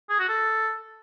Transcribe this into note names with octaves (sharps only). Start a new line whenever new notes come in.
G#4
F#4
A4